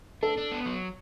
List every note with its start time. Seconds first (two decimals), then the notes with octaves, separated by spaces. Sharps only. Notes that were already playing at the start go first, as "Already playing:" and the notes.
0.23 D4 A4
0.38 D4
0.52 B3
0.66 F#3